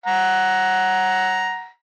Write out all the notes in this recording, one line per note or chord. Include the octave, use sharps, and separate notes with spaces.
F#5 A#5